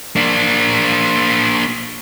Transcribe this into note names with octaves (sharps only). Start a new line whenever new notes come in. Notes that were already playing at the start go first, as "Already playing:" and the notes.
A#3 D4